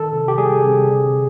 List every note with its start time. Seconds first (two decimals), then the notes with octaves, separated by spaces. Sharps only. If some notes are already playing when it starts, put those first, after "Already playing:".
Already playing: D#3 A4
0.13 C3
0.28 G4
0.38 G3 G#4
0.64 C3
0.90 D3